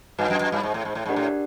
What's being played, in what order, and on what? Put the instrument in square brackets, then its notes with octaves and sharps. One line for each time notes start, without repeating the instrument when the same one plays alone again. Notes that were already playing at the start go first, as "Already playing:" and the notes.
[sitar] G2 [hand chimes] F#4 B4 D#5 F#5 A5
[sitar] F#2
F#2
G2
G#2
A2
G#2
A2
[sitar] G#2 [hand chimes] D4 G4 A#4 D5 F#5
[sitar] A2